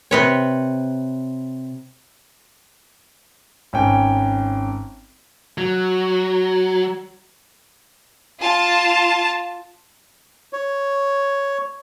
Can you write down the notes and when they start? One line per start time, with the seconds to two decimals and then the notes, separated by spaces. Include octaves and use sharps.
0.11 C3 B4 C#5
3.73 G#1 C#4 G5 G#5
5.58 F#3
8.39 F4 A5
10.53 C#5